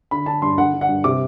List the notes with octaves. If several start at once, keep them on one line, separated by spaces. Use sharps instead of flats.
D3 B5
D3 A5
G2 C6
D3 F#5
D3
F#5
G2
C3 D6